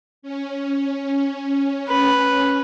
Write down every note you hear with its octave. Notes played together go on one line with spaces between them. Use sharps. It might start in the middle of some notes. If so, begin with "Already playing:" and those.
C#4
B4